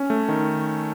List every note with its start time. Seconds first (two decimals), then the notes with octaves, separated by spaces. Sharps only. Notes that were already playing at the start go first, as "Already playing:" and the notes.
Already playing: C#4
0.10 A3
0.28 D#3